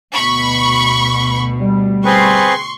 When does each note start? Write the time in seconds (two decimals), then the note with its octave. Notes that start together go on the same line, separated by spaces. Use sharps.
0.15 D2 B2 B5 C#6
1.61 G3
2.05 C4 G#4 B4 C6 C#6